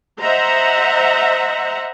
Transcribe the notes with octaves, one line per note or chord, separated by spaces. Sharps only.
C5 D#5 E5 F#5 A#5